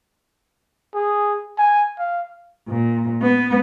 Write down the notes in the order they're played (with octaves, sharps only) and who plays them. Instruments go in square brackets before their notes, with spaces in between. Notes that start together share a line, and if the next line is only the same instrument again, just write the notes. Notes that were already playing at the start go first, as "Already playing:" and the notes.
[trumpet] G#4
G#5
F5
[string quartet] A#2
B3